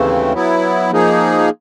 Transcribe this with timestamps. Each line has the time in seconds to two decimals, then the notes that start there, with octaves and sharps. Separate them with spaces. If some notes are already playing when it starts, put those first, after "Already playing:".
Already playing: D#2 C#3 E3 A3 C4
0.33 F#3 B3 E4
0.91 F3 A#3 D#4 G#4